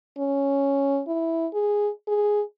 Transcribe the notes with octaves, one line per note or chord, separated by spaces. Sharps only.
C#4
E4
G#4
G#4